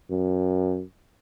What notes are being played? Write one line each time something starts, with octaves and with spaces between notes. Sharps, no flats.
F#2